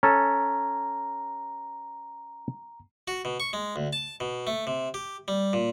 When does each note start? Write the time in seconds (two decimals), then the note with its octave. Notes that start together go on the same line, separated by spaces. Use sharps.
0.03 C#4 A4 A#5
3.08 F#4
3.25 B2
3.40 C#6
3.53 G#3
3.76 D2
3.93 A5
4.20 B2
4.47 A3
4.67 C3
4.94 G4
5.28 G3
5.53 A#2